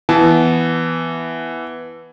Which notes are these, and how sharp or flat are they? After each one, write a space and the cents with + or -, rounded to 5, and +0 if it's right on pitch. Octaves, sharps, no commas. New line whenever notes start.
E3 +0 B3 +0 A5 -25